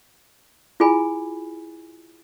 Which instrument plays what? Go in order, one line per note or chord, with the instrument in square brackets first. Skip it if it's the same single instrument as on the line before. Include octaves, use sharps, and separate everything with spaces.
[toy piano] E4 F4 G#4 G#5 B5